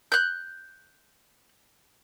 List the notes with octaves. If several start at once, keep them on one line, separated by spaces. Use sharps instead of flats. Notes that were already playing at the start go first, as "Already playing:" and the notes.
F#6 G6